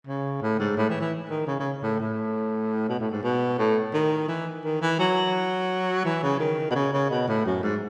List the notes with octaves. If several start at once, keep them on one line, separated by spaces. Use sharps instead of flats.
C#3
A2
G#2
A2
E3
E3
D#3
C#3
C#3
A2
A2
B2
A2
G#2
B2
A2
D#3
E3
D#3
E3
F#3
E3
C#3
D#3
B2
C#3
C#3
B2
A2
F#2
G#2